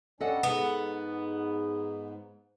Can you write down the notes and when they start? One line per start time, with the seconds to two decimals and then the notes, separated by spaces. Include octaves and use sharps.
0.20 G3 C#4 D4 A4 D#5 F#5
0.43 G#2 B3